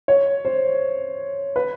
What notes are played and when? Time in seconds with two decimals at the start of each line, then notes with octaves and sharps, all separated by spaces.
0.08 C#5
0.45 C5
1.56 B4